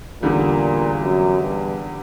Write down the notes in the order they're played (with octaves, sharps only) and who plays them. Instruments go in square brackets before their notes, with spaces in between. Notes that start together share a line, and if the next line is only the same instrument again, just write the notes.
[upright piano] E2 D3 G3 [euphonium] A#2
[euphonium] F#2
G2